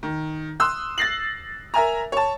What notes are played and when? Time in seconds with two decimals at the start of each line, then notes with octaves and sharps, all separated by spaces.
0.03 D#3
0.60 C6 D#6 E6 F#6
0.98 A6 A#6 C7 F#7
1.74 A#4 E5 G#5 A#5
2.12 C#5 A5